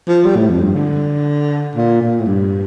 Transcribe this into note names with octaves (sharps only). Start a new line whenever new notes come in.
F3
G3
A2
F2
G2
D3
A#2
A#2
A2
G2